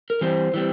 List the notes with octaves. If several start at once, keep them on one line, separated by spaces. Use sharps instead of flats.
A#4
E3 G3 C4 C5
E3 G3 C4